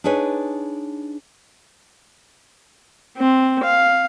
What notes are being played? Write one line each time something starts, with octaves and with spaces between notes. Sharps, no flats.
D4 D#4 G#4 B4 C#5
C4
F5